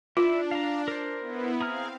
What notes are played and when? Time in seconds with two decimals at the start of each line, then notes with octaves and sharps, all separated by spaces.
0.17 D4 E4 F4 E5
0.51 F5 A#5
0.88 A#4 C5
1.20 B3 E4
1.61 C4 G#4 F5 A#5 F6